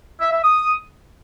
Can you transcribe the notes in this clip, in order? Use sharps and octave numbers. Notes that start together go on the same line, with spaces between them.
E5
E5
D#6